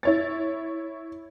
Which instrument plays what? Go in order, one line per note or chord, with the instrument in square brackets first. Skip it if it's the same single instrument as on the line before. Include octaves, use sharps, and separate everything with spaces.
[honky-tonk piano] E4 C#5 A6